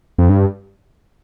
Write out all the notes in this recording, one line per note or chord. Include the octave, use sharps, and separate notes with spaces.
F2
G2